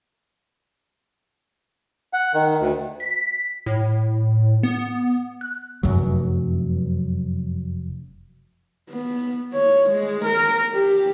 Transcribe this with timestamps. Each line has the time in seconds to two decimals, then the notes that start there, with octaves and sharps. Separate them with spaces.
2.13 F#5
2.34 D#3
2.60 D2
3.00 B6
3.66 A2
4.63 B3
5.41 F#6
5.83 F1 F#2 F#3
8.90 B3
9.53 C#5
9.90 G#3
10.25 A#4
10.74 G4